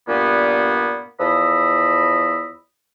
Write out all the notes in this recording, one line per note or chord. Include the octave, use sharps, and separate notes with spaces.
G2 A#2 A#3 B3
E2 F3 D#5 B5 E6